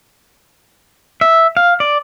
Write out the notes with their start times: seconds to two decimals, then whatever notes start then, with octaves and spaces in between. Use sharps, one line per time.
1.21 E5
1.57 F5
1.80 D5